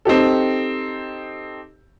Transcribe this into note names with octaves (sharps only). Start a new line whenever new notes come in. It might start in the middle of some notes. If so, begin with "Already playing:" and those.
C4 D#4 G4 A4